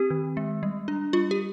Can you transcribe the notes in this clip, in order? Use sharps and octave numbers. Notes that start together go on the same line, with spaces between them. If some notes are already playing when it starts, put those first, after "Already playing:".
Already playing: C4 G4
D#3
G#3
G3
D4
G3 F4
G4